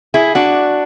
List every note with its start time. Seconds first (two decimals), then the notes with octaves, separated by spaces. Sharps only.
0.14 E4 G#4
0.35 D4 F#4